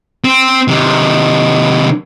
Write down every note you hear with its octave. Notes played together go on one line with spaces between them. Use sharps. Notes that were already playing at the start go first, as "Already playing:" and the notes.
C4
C3 D#3